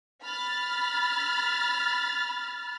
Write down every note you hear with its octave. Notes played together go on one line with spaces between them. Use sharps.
B5 F6 A6